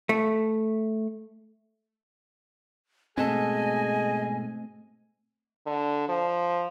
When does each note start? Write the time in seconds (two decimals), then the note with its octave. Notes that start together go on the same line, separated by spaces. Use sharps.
0.09 A3
3.18 G#2 B2 A3 C4 G#4 A4 D#5 G#5
5.66 D3
6.08 F3